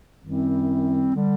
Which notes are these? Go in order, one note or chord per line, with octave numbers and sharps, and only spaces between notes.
F#2 D#3 G3 C4 E4
D3 G3